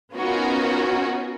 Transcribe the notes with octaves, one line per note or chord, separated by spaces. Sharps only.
B3 C#4 D#4 F4 F#4 A#4